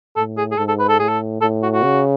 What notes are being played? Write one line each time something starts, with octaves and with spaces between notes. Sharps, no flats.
A2 A4
G#4
G#4
G#2 A4
A4
B4
A4
A2 G#4
A4
A2 A4
F#4
F#4
C#3